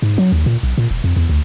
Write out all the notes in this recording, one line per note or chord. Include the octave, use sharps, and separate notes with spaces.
G#2
F#3
D#2
A#2
B1
A#2
E1
F2
E2
D2